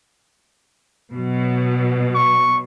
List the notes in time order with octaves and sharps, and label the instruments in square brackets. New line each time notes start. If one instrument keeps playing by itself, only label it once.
[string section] B2 F#3
[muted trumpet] C#6